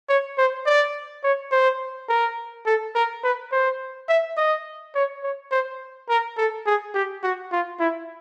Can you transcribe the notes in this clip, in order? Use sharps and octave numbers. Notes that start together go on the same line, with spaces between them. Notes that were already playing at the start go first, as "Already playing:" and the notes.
C#5
C5
D5
C#5
C5
A#4
A4
A#4
B4
C5
E5
D#5
C#5
C#5
C5
A#4
A4
G#4
G4
F#4
F4
E4